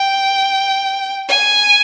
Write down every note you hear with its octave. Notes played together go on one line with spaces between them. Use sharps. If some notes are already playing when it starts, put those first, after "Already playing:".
Already playing: G5
G#5